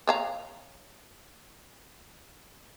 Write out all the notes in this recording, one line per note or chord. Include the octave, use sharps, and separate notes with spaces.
C#5 F5 A#5